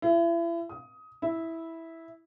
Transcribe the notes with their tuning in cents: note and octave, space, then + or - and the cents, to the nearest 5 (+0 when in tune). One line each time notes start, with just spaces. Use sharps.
E4 +35
D#6 +20
E4 -10